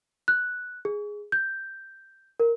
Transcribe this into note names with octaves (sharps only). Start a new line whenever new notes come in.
F#6
G#4
G6
A#4